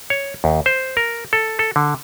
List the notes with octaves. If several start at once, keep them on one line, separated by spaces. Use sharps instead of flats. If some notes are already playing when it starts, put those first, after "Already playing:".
C#5
D#2
C5
A#4
A4
A4
D3